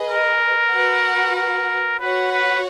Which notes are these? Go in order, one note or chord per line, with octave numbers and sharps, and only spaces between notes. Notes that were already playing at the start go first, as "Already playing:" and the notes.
Already playing: G#4 B4 D#5
A#4
F#4 B4 F#5
A#4
F#4 B4 C#5 F#5
B4